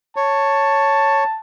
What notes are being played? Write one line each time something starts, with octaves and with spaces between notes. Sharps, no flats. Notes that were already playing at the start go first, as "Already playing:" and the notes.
C#5 A5